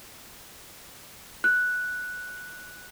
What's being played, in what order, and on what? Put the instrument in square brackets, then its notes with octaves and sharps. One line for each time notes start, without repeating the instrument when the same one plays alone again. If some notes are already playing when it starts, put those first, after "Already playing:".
[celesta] F#6